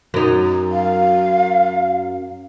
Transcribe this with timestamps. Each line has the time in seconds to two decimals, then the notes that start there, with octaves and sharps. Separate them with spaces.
0.14 F#2 D#4
0.72 F5